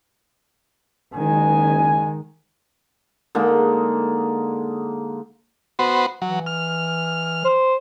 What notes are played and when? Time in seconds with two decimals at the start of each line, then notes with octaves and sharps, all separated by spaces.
1.14 F#1 D#3 G#3 G#5
3.35 D3 G#3 A#3 D#4
5.79 B3 F#4 C5
6.22 E3 F#3
6.46 F6
7.45 C5